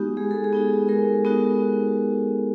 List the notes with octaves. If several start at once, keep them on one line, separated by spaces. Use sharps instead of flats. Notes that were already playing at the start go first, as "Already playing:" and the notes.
Already playing: G#3 B3 D#4 F#4 G4
G#3 G#4
A4
G#4
B3 D#4 F#4
G#3 A#4
B3 D#4 F#4